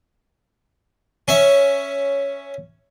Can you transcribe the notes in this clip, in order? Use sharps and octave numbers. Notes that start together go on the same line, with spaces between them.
C#4 E5